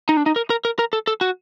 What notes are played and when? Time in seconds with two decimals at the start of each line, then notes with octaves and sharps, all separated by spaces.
0.09 D#4
0.17 D4
0.26 D#4
0.36 A#4
0.50 A#4
0.65 A#4
0.79 A#4
0.93 A4
1.07 A4
1.21 F#4